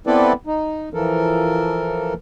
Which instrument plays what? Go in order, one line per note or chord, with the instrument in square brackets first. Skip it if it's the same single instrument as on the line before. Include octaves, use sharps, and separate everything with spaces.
[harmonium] B3 C4 E4 A4 B4 D5
D#4
E3 F3 A4 A#4